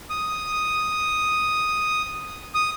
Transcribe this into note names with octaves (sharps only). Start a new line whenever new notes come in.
D#6
D#6